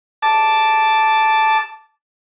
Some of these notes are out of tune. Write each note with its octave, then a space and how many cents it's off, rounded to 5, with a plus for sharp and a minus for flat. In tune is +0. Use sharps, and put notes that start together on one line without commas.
A5 +0 D6 +0